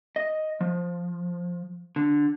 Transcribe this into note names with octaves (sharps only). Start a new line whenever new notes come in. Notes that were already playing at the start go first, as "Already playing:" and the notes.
D#5
F3
D3